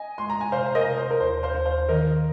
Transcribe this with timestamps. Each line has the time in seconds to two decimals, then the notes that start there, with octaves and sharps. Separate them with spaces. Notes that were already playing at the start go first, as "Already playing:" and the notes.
Already playing: D#5 G#5
0.18 G#3 C6
0.30 A#5
0.41 G#5
0.52 C3 C5 F5
0.66 F5
0.75 A#4 D#5
0.87 C3
0.98 C5
1.10 A#4
1.20 D#2 C5
1.43 C5 F5
1.55 D#2
1.65 C5 F5
1.89 D#3 A#4 D#5